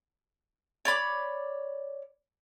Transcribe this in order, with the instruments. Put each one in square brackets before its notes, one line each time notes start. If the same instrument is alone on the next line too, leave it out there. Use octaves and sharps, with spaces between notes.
[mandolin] C#5 D5 B5 D6